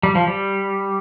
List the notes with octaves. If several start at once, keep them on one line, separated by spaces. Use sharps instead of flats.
G3
F3
G3